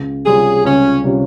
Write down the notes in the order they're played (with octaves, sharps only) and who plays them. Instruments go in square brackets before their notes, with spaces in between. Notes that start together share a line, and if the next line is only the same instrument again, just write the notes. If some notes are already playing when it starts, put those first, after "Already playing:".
Already playing: [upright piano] C#2
[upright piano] C3 G3 C#4 F4 [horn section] G#4
[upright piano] C#2 [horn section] C#4
[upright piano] C3 G3 C#4 F4